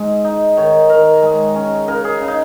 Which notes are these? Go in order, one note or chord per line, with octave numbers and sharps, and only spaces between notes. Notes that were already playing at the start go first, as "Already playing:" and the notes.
Already playing: G#2 G#3
D#4
D#3 C#5
D#3 A#4
G#3
C#4
C#3 A#4
G#4
C#3
D#4